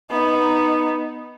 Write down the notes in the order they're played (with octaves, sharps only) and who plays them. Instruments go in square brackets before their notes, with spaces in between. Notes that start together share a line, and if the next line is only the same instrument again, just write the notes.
[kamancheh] B3 D#4